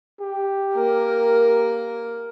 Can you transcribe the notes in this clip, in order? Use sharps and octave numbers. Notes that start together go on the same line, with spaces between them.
G4
A#3 A#4